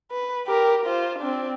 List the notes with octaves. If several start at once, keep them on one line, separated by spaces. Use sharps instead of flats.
B4
G4 A#4
F4 C5
C4 D4